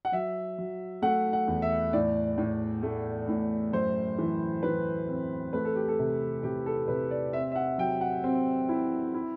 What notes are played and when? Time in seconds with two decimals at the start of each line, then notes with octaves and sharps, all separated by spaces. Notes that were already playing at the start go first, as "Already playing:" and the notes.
0.05 F#5
0.12 F#3 E5
0.58 F#3
1.02 A3 F#5
1.33 F#5
1.47 E2
1.62 E5
1.93 A2 D5
2.38 A2
2.83 A3
3.28 A2
3.73 F#2 C5
4.18 E3
4.63 E3 B4
5.08 C4
5.53 A3 B4
5.65 A4
5.76 G4
5.88 A4
5.99 C3
6.43 C3 G4
6.66 A4
6.88 C3 B4
7.11 D5
7.33 C4 E5
7.52 E5
7.56 F#5
7.78 F#3 G5
8.01 F#5
8.24 C4
8.69 E4
9.14 E4